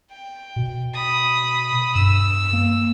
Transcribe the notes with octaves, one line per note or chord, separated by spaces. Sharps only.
G5
B2
B5 D#6
G2 E6
A#3